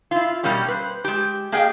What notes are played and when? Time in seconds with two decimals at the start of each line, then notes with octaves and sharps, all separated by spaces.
0.11 E4 F4
0.43 B2 G3 A#3 C#4 G4
0.68 B4 C5
1.04 G#3 G4
1.52 A#3 G4 G#4 D#5 F5 G5